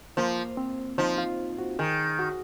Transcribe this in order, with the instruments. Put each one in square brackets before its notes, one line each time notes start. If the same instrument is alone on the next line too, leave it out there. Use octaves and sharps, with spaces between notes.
[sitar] F3 [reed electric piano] A#3
[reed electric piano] C4
[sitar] F3 [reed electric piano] D#4
[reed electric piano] F4
F#4
[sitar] D#3 [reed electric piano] G#4
[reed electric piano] F#4